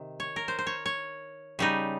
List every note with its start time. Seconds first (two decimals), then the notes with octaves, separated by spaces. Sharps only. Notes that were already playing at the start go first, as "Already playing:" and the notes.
Already playing: C3 D#3
0.20 C#5
0.36 A#4
0.48 C5
0.59 C5
0.67 C#5
0.86 C#5
1.59 C#3 G3 D#4